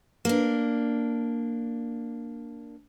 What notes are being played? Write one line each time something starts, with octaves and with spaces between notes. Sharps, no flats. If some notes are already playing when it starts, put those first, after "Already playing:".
A#3 D4